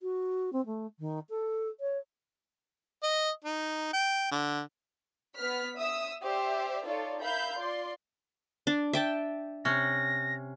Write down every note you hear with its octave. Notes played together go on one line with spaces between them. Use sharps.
F#4
C4
A3
D#3
A4
C#5
D#5
D#4
G5
D3
B3 B4 F6 B6
E5 D#6 E6
G4 C5 D5 E5
D#4 F4 A4 C#5 D5
A#4 E5 F5 B5 G6
F4 D5 C6
D4
E5 G5 A5
C3 C#4 A#6